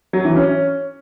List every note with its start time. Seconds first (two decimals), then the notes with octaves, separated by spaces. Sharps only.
0.13 F#3
0.25 E3
0.36 C#4